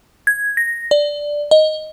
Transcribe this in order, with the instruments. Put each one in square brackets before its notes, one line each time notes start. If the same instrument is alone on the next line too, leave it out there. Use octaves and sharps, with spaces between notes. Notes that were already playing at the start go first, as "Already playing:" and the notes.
[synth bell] G#6
A#6
D5
D#5